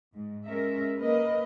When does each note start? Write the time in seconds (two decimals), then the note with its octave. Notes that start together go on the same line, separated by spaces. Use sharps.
0.14 G#2
0.46 G#3 C#4 A#4 E5
0.98 A#3 A#4 B4 D#5